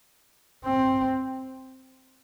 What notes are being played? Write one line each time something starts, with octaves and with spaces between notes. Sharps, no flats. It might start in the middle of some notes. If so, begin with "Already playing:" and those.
C4